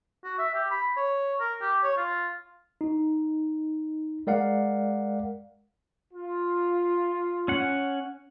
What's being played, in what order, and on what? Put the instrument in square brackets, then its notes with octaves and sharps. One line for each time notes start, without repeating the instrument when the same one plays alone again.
[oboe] F#4
E5
G4
B5
C#5
A#4
G4
C#5
F4
[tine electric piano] D#4
G#3 A#4 D5 F5 F#5
[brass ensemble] F4
[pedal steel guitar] C#4 F#5